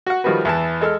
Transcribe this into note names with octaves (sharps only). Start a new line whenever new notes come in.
F#4 F#5
D#3 F3 G3 F#4 B4
E2 E3 A5
G#3 A4 E6 F6